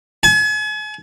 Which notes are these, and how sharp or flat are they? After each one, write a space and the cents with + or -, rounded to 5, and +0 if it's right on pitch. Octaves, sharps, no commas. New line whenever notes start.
G#5 +40